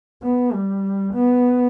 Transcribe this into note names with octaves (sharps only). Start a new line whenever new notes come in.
B3
G3
B3